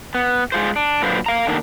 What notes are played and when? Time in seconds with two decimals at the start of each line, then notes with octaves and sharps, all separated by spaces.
0.15 B3
0.52 G#3 F4 C5
0.76 D4
1.02 A#2 D3 F#3 B4 C5 F5
1.26 A#3 F5 A#5
1.47 D3 D#3 A#3 D4